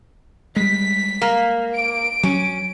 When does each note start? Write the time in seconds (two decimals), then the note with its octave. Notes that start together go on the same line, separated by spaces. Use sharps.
0.56 G3 G#3 B6
1.22 A#3
1.75 D7
2.23 F#3 C#4